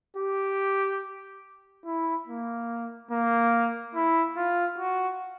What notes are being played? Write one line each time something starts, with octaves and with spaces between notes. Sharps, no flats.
G4
E4
A#3
A#3
E4
F4
F#4